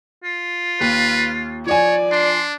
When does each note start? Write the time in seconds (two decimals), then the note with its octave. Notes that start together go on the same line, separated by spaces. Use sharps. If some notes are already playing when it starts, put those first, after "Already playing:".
0.24 F4
0.80 D#2 B4
1.67 F3 C#5 D5 G#5
2.12 D4 C6